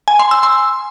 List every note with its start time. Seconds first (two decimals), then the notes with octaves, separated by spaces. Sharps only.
0.08 G#5
0.19 C6
0.31 E6
0.43 C6